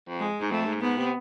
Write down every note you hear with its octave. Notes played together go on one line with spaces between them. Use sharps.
F2
G#3
G#2
F2 A3
G#2
G#2 B3
C3